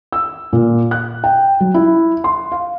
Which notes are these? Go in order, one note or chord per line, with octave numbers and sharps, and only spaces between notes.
E6
A#2
F#6
G5
F#3
E4
C6
F5